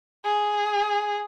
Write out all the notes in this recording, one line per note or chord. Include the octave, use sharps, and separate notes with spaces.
G#4